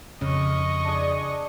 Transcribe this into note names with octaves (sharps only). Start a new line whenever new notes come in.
F2 C#3 D#5 C#6
D4 G#4